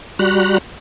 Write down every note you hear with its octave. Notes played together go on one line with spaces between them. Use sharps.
G3 F#4 A#5 B5 F#6